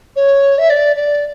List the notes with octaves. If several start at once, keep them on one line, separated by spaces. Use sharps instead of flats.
C#5
E5
D5
D5